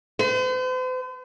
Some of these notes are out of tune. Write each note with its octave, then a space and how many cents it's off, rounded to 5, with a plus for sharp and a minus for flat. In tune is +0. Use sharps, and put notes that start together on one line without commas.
C5 -45